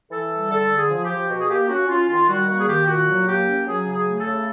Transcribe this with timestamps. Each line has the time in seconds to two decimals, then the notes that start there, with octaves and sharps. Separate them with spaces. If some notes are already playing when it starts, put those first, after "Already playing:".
0.10 E3 A4
0.30 G3
0.50 D3 A4
0.69 D3
0.77 G#4
0.89 F3
1.03 G4
1.09 F3
1.29 B2 F#4
1.39 G#4
1.49 A#3 G4
1.68 C#4 F#4
1.88 C#4 F4
2.08 D#3 F4
2.28 G3 F#4
2.47 A#3 F#4
2.59 G#4
2.67 D#3 G4
2.87 A#2 F#4
3.07 F#3
3.26 A#3 G4
3.47 C#4
3.66 F#3 G#4
3.86 C#3
3.93 G#4
4.06 A3
4.19 A4
4.26 C#3